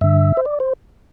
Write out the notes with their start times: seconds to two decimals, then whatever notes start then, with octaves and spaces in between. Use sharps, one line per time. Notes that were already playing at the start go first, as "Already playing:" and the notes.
0.01 G2 D3 E5
0.37 C5
0.45 D5
0.60 C5